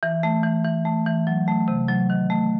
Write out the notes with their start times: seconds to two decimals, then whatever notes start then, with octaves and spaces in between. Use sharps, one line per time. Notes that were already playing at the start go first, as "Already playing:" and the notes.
0.03 E3
0.23 A3
0.43 E3
0.64 E3
0.85 A3
1.06 E3
1.27 F#3
1.48 A3
1.68 C3
1.89 F#3
2.10 D#3
2.30 A3